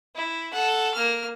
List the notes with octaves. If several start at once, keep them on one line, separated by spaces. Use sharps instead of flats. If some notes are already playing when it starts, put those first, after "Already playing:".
E4
A4 F#5
A#3 F6